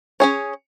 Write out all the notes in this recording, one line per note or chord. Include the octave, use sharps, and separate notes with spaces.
C#4 G#4 C#5